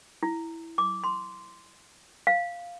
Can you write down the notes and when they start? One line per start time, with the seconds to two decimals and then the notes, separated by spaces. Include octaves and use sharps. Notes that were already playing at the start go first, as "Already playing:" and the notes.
0.23 E4
0.78 D6
1.04 C6
2.27 F5